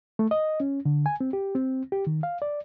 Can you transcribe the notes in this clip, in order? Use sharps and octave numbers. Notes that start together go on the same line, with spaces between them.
A3
D#5
C#4
D3
G#5
C4
G4
C4
G4
D#3
F5
D5